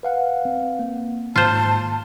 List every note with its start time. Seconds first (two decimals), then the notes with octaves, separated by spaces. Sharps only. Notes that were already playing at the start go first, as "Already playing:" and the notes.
0.03 B4 F5 F#5
0.45 C4
0.79 A#3
1.36 G#2 D#3 F4 C5 A5